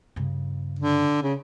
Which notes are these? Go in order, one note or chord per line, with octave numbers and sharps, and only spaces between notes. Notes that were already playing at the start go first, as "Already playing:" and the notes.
G2 C#3
D3
C#3